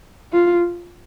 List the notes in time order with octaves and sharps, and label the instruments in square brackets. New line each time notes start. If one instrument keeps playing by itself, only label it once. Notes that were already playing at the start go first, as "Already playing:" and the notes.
[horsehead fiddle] F4